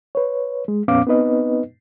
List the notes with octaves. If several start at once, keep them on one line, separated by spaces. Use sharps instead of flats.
B4 C#5
G#3
F2 A#2 B3 C#4 F5 D6
B3 C4 D#4 B4 D#5